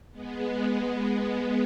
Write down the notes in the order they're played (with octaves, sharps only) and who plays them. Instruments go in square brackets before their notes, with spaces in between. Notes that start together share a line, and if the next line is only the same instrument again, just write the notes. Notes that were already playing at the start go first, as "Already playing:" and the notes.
[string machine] G#3 B3